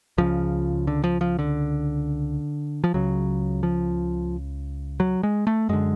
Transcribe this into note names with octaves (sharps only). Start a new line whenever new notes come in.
C#2 C#3 F3
D3
F3
F3
D3
F3
C#2 C#3 F#3
F3
F#3
G#3
A3
F#2 D3 G#3